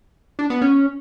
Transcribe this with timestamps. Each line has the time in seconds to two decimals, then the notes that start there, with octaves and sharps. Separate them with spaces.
0.39 D4
0.50 B3
0.62 C#4